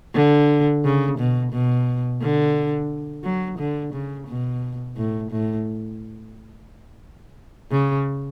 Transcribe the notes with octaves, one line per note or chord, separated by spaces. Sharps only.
D3
C#3
B2
B2
D3
F#3
D3
C#3
B2
A2
A2
C#3